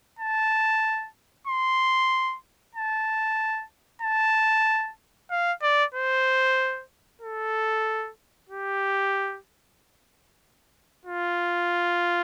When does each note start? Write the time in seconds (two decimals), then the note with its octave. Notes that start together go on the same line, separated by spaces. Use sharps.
0.19 A5
1.47 C6
2.75 A5
4.02 A5
5.30 F5
5.62 D5
5.94 C5
7.21 A4
8.49 G4
11.05 F4